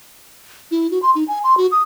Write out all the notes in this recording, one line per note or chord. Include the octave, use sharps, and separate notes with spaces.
E4
F#4
C6
D#4
G#5
C6
F#4
D#6